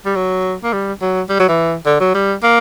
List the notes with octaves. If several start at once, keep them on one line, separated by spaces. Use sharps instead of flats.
G3
F#3
A#3
G3
F#3
G3
F#3
E3
D3
F#3
G3
A#3